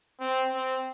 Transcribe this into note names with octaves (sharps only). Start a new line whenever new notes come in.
C4
C4